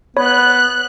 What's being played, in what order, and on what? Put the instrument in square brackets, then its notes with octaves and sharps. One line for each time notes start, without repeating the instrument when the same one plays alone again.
[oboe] B3 [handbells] C#5 B5 [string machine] F#6